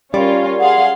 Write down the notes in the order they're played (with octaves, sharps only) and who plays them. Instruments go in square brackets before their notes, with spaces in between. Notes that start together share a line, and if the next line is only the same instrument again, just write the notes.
[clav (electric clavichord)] G3 [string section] C#4 F4 A#4 [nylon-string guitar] D5
[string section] G#4 F5 C6 [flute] F#5